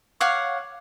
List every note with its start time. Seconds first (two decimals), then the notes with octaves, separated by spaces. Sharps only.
0.20 C#5 F5 F#5 D6